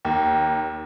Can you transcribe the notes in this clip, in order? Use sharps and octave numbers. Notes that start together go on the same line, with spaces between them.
D#2